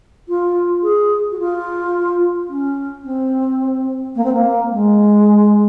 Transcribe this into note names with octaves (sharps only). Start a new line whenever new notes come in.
F4
G#4
F#4
F4
C#4
C4
A#3
C4
A#3
G#3